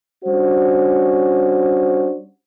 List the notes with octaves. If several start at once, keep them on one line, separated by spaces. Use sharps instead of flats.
G3 C#4 D4 F#4 C5